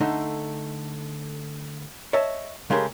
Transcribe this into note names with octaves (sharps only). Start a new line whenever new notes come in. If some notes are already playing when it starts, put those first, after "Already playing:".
D3 A3 D#4
C#5 D#5 E5 A5
C#3 G#3 A3 G4 A#4